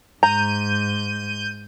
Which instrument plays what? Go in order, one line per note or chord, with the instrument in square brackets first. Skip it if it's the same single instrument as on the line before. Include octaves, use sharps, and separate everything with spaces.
[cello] G#2 [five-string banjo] A#5 [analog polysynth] G6 D#7